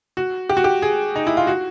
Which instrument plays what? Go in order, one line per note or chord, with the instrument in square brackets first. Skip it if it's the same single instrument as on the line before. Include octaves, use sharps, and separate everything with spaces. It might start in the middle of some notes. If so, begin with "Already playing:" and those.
[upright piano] F#4
G4
F#4
G4
G#4
D#4
E4
F4
F#4